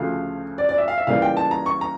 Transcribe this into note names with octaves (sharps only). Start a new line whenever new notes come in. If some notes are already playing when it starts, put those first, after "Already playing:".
Already playing: D2 C#3 F3 A3 F5
D5
D5
E5
F5
E5
C#2 C#3 E3 G3 A#3 F5
G5
A5
A#5
C#6
A#5